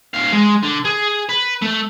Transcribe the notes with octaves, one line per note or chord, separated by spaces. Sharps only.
D2 F5
G#3
D3
G#4
B4
A3